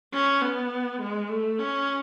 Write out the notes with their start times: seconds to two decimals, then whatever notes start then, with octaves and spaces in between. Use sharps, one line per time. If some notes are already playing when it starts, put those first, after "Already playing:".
0.13 C#4
0.41 B3
1.01 G#3
1.29 A3
1.59 C#4